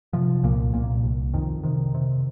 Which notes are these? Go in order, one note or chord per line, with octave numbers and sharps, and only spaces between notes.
C3 F3
C2 A#2 A#3
C2 A#2 A#3
C2
F2 D#3
C3 D#3
C3